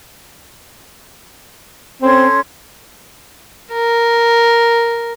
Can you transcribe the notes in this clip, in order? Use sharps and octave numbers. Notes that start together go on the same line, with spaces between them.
C4 C#4 A4 C6
A#4